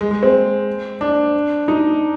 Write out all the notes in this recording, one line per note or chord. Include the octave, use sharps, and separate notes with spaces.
G#3
G#3
C4
D4
D#4